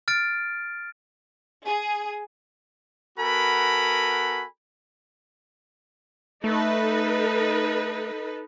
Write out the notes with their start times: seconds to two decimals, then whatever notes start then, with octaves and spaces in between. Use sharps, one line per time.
0.08 F6 A6 D7
1.65 G#4
3.18 B3 F#4 A4 A#4 G#5 B5
6.44 A3 D#4 A4 B4